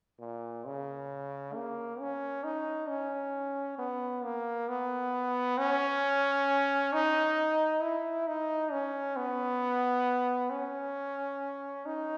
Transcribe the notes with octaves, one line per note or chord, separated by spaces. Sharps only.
A#2
C#3
A#3
C#4
D#4
C#4
B3
A#3
B3
C#4
D#4
E4
D#4
C#4
B3
C#4
D#4